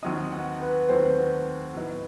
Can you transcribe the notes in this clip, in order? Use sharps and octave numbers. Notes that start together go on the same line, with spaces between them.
D#2 D#3 F#3 C4 D#4 D#6
F#5
B4
D#2 D#3 F#3 A3 C4 C5
A2 F#3 B3 D#4